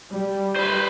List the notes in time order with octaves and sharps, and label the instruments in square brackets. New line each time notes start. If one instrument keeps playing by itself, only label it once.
[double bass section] G3
[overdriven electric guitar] B4 C5